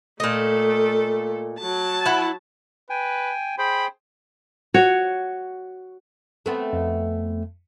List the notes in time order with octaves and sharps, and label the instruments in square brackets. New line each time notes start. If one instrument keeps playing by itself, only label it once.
[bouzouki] A#2 D#5 [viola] A3 A4
[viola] F#3 A5
[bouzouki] E4 F#5
[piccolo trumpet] B4 [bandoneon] G5 G#5
[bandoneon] G#4 C5 G5 [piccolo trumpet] B5
[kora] F#4 C#5
[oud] A3 B3 C4
[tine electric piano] F2